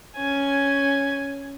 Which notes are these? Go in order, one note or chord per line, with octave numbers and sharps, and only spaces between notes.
C#4 G#5